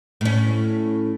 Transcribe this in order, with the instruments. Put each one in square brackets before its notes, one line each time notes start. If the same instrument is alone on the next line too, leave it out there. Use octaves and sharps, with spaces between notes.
[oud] A2 C#4